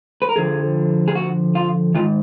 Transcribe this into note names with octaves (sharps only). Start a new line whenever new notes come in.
B4
A#4
F2 D3 F3 G#4
G#4
F#4
F4
G#2 D#3 F4